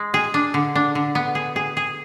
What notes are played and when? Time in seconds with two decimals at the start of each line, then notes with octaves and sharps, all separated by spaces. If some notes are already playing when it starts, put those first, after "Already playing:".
Already playing: G#3
0.14 G#4
0.34 D4
0.54 D3
0.75 D4
0.95 D3
1.15 B3
1.35 G#4
1.56 G#4
1.77 G#4